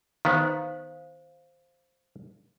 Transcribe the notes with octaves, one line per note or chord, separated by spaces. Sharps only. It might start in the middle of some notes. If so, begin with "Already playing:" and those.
D#3 B3 C5 F5